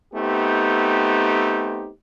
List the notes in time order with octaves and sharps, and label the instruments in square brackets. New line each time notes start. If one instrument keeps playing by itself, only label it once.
[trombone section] A3 B3 C4 D#4 G4